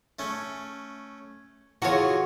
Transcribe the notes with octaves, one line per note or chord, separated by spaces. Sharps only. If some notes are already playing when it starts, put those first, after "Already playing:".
A3 C#4
E3 F4 F#4 G#4 C#5